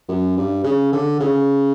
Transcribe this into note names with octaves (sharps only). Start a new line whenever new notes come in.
F#2
G2
C#3
D3
C#3